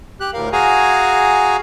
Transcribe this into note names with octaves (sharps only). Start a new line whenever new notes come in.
G4 F#6
D2 A2 A#4 F5
F#4 G#4 F5 G#5 A#5